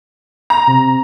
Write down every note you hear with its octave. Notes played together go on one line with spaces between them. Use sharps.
A#5
C3